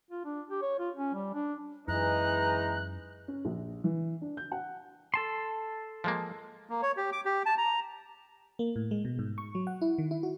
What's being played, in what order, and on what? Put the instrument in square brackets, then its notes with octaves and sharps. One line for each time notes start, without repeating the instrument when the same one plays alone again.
[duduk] F4
D4
G4
C#5
F4
C#4
G3
D4
[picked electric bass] F#2 [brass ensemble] E3 G#3 D#4 [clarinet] A#5 [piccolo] F#6
[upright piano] C#4
A#1
E3
D4
G6
F#5
[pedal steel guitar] A4 A5 C6
[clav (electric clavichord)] F3 G#3 A#3
[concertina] A#3
C#5
G4
D6
G4
A5
A#5
[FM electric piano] A#3
A2
G#3
B2
G#2
C#6
F#3
F#5
E4
D#3
E4
F#4